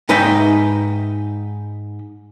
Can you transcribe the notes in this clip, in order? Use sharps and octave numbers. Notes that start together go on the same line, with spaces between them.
G#2 D#4 B4 E5 G5